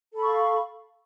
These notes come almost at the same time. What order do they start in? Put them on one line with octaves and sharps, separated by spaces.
A4 B5 C#6 F5